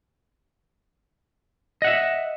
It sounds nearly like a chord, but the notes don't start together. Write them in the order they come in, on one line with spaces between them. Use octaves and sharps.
D#5 F#5 E5